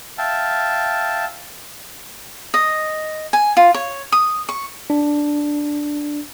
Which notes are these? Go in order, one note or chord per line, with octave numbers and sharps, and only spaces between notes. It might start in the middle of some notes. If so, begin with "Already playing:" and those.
E5 F5 G5 A5
D#5
G#5
F4
C#5
D#6
C#6
D4